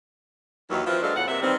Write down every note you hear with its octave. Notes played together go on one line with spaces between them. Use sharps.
D#2 D#3 E3 F#3
F3 C4 E4 A#4 B4
F#3 G#3 D4 A4 F5
E2 A2 F#5
C3 A#3 C4 E5
D#3 E3 G3 C4